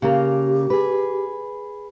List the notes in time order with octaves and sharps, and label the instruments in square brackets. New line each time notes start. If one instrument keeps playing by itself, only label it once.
[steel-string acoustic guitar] C#3 A#3 A#4 [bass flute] G4
[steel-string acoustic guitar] G#4 B4